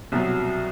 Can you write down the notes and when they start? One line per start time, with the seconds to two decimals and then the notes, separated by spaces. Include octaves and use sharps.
0.12 C2 B2 F#3